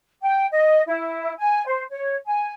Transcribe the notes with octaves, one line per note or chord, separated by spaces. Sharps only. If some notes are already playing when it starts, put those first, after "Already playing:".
G5
D#5
E4
G#5
C5
C#5
G#5